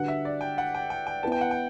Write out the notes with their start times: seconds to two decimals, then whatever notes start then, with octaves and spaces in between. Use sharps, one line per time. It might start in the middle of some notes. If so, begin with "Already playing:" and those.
Already playing: D3 G3 D4 F#4 B4 F#5
0.08 E5
0.25 D5
0.41 G5
0.58 F#5
0.74 G5
0.90 G5
1.07 G5
1.23 B3 E4 B4 A5
1.32 G5
1.41 F#5
1.51 G5